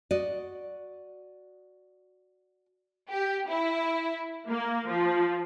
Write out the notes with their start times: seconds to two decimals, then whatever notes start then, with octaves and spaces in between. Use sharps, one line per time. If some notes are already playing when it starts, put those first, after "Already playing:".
0.11 F#4 D5 D#5
3.10 G4
3.48 E4
4.48 A#3
4.89 F3